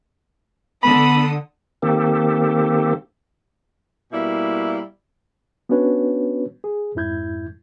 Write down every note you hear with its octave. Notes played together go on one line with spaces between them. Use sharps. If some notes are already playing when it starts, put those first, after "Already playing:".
D3 B3 A4 B5 D#6
D#3 A#3 C4 G4 A4
B2 G3 A#3 E4
B3 C#4 D4 F#4 B4 C#5
G#4
F2 G#2 E4 G6 G#6